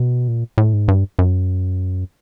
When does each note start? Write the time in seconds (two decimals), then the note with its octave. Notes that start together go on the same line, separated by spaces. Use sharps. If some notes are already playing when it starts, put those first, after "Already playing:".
Already playing: B2
0.28 A#2
0.58 A2
0.73 G#2
0.88 G2
1.19 F#2